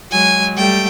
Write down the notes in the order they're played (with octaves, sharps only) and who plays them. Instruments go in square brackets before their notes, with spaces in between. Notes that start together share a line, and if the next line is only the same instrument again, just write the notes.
[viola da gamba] F#3 G#3 [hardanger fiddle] G#5
[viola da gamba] G3 A3 [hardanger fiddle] G5